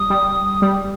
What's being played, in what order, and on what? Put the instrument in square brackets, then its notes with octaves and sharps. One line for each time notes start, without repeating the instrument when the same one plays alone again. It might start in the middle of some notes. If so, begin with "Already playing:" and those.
Already playing: [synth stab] G3 [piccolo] D#6
[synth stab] G3
G3